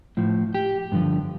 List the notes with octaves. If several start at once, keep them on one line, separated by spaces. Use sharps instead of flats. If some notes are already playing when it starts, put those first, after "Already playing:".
A2 F3
G4
G2 D3 F3